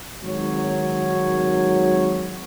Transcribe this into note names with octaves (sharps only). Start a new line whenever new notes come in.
G#1 F#3 C#5